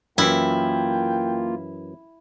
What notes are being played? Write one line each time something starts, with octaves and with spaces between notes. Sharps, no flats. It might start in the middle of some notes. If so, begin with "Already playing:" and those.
F#2 E3 A#3 E4 F4 G5